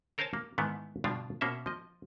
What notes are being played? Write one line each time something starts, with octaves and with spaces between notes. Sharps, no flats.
A4 A#4 C5 C#5 G#5 A5
A#3
G#2 D#3 E3 A3 B3
G2 B2 D3 F3 D4 F4
B2 A#3 C#4 C5 E5
F3 D#5